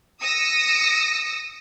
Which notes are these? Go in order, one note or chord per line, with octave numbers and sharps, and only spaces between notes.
D#6 E6 A#6 C#7